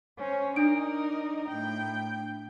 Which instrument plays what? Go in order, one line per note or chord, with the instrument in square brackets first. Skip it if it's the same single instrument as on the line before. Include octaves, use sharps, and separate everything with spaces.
[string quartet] C#4 C5
[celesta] D4 D7 [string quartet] D#4 A#4 D5
[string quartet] A2 G5